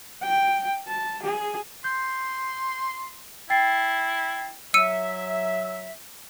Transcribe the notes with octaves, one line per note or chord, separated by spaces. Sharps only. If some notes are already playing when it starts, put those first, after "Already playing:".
G5
A5
G#4
C6 G6
E4 G5 A6 C7
F#3 E5 E6 C#7 D#7